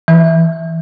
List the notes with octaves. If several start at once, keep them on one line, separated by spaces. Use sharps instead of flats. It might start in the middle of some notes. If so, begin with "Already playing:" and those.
E3